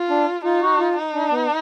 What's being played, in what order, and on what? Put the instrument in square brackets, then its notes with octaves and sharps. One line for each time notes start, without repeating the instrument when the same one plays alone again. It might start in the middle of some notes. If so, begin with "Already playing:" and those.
Already playing: [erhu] F4
[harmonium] D4
[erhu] D#4 [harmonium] F4
[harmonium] F#4
F4
[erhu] D#4
[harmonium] D4
B3